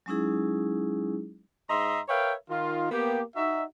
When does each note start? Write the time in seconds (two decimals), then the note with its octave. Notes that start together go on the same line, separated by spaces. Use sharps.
0.06 F#3 G#3 C#4 D#4 E4 G#4
1.70 G#2 D#5 E5 A#5 C6
2.09 A#4 B4 C#5 E5 F5 G5
2.50 D#3 F4
2.91 A#3 B3 G4
3.36 D#4 F#4 E5